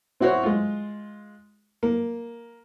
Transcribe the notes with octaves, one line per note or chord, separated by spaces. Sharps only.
C4 E4 F#4 C5 C#5
G#3 F4
A#3